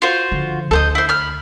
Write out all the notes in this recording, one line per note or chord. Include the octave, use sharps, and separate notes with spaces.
F4 F#4 C5
D3 F3
D2 A4 C5 D#5
E4 C5
B5 F6